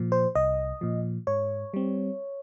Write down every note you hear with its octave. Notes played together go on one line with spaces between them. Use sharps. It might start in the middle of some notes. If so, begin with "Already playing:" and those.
Already playing: A#2 F3
C5
C2 D#5
A#2 F3
G#2 C#5
G3 C4